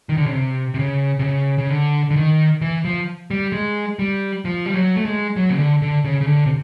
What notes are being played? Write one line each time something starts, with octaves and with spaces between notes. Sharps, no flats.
D#3
D3
C#3
C3
C3
C#3
C3
C#3
C#3
D3
D3
D#3
E3
F3
G3
G#3
G3
F3
G3
F#3
A3
G#3
F#3
C#3
D3
D3
C#3
C#3
D3
C3